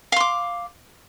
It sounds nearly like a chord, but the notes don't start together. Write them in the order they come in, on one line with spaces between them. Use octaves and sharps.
F5 C6 D6